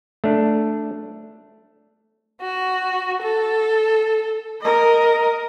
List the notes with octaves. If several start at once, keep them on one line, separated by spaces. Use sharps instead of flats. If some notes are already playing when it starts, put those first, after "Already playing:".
A3 D4
F#4
A4
A#4 D#5